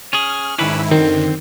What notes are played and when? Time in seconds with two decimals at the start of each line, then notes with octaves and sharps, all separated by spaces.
0.13 C#4 G#4 F6
0.58 G#2 D#3 C#4 D4 E4 B4
0.91 F#2 D3 D#3 C4